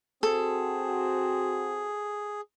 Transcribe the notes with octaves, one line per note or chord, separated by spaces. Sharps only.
C4 F#4 G#4 A4